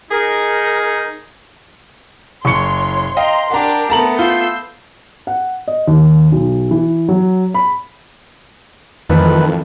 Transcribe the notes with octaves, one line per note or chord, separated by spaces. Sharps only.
D#4 G#4 A#4
F#1 C#5 C6 C#6 C#7
D#5 F5 G5 A#5 C6
D4 G4 A#4 F#5 A#5
A3 B3 A5 A#5 F#7
F4 E6 G6 C7
F#5
D#5
D#2
B1
E3
F#3
B5
F2 D#3 E3 A3 B4